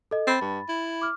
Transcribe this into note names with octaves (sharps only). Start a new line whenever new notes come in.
A4 D#5
C4 B5 A6
G2
E4
D6 F6